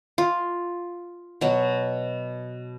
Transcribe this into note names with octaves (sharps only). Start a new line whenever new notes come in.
F4
B2 F#3